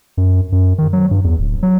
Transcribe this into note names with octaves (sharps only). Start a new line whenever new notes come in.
F#2
F#2
D#3
F#3
G2
E2
D1
F#3